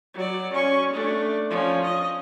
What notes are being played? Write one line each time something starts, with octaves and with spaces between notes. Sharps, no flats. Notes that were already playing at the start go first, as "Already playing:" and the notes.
F#3 D5
C#4 C#6
A3 D4
F3 C#4
D#5